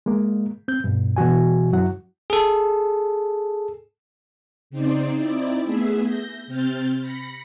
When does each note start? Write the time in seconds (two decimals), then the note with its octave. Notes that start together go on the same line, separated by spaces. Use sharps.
0.06 G#3 A#3
0.68 C4 G6
0.84 G2 B2
1.17 B2 E3 F#4 G#5
1.72 F#2 F#3 E4 F#4 F#5
2.30 G#4 A4
4.70 C#3 C4 D#4 C5 D5
5.16 C4 D#4 E4 D5
5.64 A3 B3 G#4 E5
6.04 G6 A#6
6.47 C3 C4 F6 G6 A6
7.00 B5 A#6 C#7